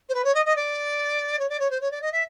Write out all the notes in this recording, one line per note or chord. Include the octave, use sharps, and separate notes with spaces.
C5
B4
C#5
D#5
D#5
D5
C#5
D5
C#5
C5
C#5
D5
D#5
E5